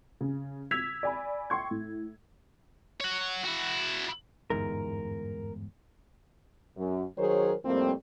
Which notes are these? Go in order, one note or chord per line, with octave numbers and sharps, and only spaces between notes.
C#3
E6 G#6 B6 F7
D5 G#5 B5
G5 C6 C#6 G#6
A2
C#5 F#5
E4 F#4
G1 E2 G#2 A#4
F#2
D#3 F#3 G#4 A#4 C5 C#5
F2 A2 G3 A#3 C4